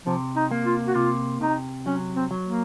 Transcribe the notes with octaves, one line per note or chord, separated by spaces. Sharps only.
C3 F3
D#4
A#3
F4
F#4
C3 F4
C3 D#4
F#3 C#4
C4
F#3
A#3